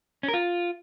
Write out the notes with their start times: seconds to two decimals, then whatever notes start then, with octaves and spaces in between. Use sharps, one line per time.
0.23 C#4
0.28 A#4
0.34 F4